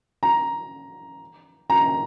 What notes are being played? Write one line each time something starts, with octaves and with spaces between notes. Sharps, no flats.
A#5
A#5